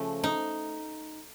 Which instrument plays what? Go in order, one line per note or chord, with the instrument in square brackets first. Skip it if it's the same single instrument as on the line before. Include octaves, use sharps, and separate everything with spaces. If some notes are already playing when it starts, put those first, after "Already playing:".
Already playing: [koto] C#3 F3 A3
D#4